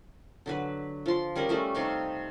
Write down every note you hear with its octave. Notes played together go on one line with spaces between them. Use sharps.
D3 F#3 B4
F3 C6
G3 C#4 G#4 A#4
G3 A3 C#4 A4
C3 D#4 F5 D6